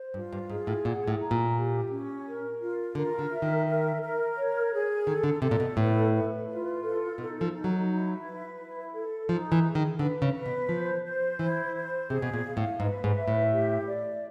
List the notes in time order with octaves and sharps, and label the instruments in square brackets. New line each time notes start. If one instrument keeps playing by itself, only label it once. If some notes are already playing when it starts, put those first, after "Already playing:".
Already playing: [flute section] C5
[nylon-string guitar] G2 [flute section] F4
[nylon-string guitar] G2
[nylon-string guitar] G#2 [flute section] G#4
[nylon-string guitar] A2
[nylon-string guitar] A#2 [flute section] F#5
[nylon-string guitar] A2
[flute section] A#5
[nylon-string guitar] A#2
[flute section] G4
C#4
A#4
F4
[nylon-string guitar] D3 [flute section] A#4
[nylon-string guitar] D3
[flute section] E5
[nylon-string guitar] D#3
[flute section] A#4
A#4
C#5
G#4
[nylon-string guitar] D#3 [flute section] A4
[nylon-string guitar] D3
[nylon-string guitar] C3 [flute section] A4
[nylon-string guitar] A#2
B2
[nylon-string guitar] A2 [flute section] B4
[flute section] B4
F4
A4
[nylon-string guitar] B2 [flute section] D#4
[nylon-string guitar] F3
[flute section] D#4
[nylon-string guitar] F#3
[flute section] E4
B4
E4
A4
[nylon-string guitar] F3 [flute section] D#4
[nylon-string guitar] E3
[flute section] G#4
[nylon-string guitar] D#3
[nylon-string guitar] D3 [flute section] B4
[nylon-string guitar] C#3
[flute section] B4
[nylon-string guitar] B2
[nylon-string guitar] F3 [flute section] C5
[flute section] C5
[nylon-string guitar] E3 [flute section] E4
[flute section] C5
[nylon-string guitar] C3 [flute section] G#4
[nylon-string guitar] B2
A#2
[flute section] F5
[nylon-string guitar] A2
[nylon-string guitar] G#2 [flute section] B4
[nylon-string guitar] G#2
[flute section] E5
[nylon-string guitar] A2
[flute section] G4
D5